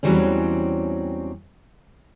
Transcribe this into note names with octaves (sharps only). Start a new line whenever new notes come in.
E2 E3 F#3 G3 C4 C#4